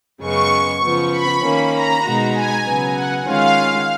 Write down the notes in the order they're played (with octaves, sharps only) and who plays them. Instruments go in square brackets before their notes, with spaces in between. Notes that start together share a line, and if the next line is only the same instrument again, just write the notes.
[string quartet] F#2 C#3 G#3 B3 [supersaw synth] C#6
[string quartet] C#3 F3 B3
[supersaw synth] B5
[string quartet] D#3 A#3 C#4
[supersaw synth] A#5
[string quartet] B2 G#3 D#4 F#4
[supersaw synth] G#5
[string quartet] C#3 F#3 B3
[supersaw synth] F#5
[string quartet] D#3 G#3 C#4 F4 [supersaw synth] F5